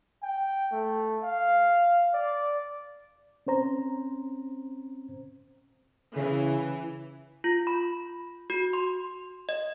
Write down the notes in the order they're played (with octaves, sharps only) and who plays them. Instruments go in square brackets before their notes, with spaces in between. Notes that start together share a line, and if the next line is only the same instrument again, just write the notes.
[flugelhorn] G5
A3
F5
D5
[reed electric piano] C4 C#4 C5 A#5
[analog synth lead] C#3 [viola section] E3
[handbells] F4
B5
F#4
C6
D#5